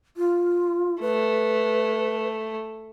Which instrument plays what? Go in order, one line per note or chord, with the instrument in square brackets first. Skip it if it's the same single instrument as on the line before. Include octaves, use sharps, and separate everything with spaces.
[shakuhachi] F4
[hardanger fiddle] A3 [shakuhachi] B4